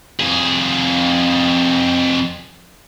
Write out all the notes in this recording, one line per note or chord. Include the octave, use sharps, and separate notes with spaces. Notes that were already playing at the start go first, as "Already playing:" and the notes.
F2 G#4